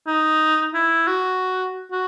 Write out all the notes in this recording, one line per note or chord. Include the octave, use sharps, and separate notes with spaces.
D#4
E4
F#4
F#4